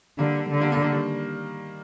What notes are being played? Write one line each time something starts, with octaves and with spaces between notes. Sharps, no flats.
D3 G3 A#3
D3
G3 A#3
G3 A#3
G3 A#3
D#3 G3